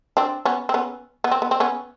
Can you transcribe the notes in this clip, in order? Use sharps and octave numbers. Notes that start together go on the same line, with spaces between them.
C4 D4
B3 C#4
C4
B3 C#4
B3
C4
B3
C4
B3 C#4